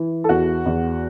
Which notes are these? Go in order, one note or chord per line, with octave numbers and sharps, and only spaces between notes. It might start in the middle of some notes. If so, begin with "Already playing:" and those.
Already playing: E3
A4
E2 F#4
E2